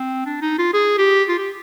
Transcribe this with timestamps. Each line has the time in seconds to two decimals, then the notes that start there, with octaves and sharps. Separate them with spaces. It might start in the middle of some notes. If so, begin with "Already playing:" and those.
Already playing: C4
0.26 D4
0.42 D#4
0.59 F4
0.74 G#4
0.98 G4
1.29 F4
1.38 G4